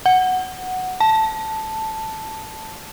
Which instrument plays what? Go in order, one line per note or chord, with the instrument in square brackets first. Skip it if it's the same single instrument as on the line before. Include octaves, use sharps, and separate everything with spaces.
[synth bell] F#5
A5